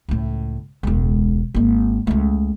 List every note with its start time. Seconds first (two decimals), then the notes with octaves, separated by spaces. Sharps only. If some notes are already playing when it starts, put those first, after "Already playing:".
0.09 C#2 A2
0.83 E1 C#2
1.54 G#1 A#3
2.07 C#2 A3